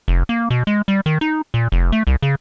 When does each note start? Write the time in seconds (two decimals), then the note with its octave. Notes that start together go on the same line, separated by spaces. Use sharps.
0.08 F1
0.29 A#3
0.50 B2
0.67 G#3
0.88 G3
1.06 D#3
1.21 D#4
1.54 A#2
1.72 F1
1.92 A3
2.07 C2
2.22 C#3